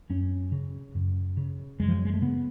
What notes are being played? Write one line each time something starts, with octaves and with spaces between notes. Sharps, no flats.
F#2 C#4
C#3
F#2
C#3
F#2 G#3
F3
F#3
G#3
A3
C#3 B3